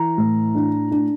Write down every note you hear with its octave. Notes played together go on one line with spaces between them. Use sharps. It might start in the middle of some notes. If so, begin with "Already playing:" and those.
Already playing: E3 A#5
A2
D4
D4